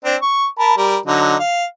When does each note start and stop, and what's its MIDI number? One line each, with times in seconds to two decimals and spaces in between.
0.04 0.16 60
0.04 0.16 62
0.22 0.46 85
0.59 0.74 70
0.59 0.74 81
0.59 0.74 83
0.77 0.97 55
0.77 0.97 70
1.06 1.35 50
1.06 1.35 54
1.06 1.35 63
1.39 1.64 77